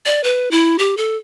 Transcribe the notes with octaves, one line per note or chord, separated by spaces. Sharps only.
D5
B4
E4
G4
A4